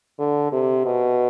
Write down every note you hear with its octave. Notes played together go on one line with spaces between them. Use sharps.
D3
C3
B2